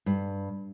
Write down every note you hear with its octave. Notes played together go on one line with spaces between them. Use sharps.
G2